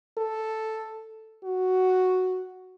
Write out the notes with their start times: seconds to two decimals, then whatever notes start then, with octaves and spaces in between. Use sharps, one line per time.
0.18 A4
1.44 F#4